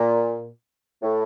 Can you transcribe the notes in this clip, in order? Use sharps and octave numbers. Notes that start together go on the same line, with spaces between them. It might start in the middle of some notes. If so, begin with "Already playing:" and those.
Already playing: A#2
A2